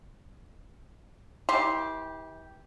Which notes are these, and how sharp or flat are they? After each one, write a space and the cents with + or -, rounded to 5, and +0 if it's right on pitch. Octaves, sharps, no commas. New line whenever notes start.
E3 -35 G4 +0 C6 +0